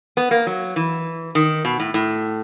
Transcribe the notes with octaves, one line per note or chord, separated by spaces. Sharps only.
B3
A#3
F#3
E3
D#3
B2
A2
A2